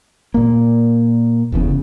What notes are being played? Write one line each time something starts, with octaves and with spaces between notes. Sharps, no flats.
A#2 A#3
F1 E2 A2 C#3